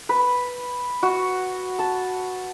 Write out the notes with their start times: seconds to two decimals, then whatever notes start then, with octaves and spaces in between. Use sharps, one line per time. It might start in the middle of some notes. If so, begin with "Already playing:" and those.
0.09 B4
1.03 F#4
1.79 A5